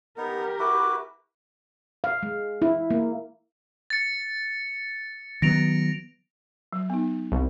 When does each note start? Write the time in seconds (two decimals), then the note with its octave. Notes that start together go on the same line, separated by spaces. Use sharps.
0.18 B3 D#4 G4 A#4
0.59 E4 F#4 B4 D6
2.04 F5
2.23 G#3
2.62 E4
2.91 A#3
3.90 A6 C#7
5.42 D#3 F#3 B3 A#6 D7 F7
6.73 F#3
6.90 B3 D#4
7.32 C2